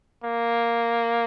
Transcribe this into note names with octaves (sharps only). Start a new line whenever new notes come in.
A#3